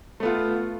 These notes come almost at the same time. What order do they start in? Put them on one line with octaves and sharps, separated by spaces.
A3 B3 F4